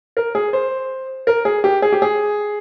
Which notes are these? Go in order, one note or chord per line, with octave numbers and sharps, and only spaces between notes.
A#4
G#4
C5
A#4
G#4
G4
G#4
G4
G#4